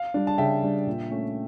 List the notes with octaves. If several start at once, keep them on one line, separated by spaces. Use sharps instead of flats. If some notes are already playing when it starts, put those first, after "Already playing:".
Already playing: F5
G3 D4
A5
C#3 E5 G5
G3 D4
A#2
A3 C#4